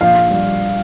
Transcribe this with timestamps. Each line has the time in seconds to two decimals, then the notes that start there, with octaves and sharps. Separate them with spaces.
0.01 A#1 F5
0.31 G3